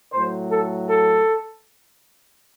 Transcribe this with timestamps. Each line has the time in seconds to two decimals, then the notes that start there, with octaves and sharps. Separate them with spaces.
0.11 A2 F#3 C5
0.50 A4
0.89 A4